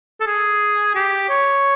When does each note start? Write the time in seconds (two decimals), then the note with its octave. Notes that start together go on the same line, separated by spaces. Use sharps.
0.20 A4
0.26 G#4
0.95 G4
1.29 C#5